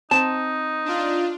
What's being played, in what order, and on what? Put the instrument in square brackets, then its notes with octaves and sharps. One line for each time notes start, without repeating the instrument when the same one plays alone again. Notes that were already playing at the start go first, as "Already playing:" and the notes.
[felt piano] C4 [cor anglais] D#4 [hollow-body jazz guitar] A5
[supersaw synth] D4 F4